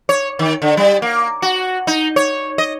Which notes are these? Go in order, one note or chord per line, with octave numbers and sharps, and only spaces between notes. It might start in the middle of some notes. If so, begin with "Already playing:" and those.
C#5
D#3
D3
G3
A#3
F#4
D#4
C#5
D#5